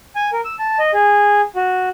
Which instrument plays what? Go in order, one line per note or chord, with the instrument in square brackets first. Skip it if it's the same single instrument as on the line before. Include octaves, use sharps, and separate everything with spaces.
[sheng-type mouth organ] G#5
A#4
E6
A5
D#5
G#4
F#4